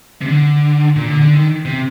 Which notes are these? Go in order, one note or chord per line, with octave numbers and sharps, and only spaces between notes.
C3
D3
A#2
D3
D3
D#3
C3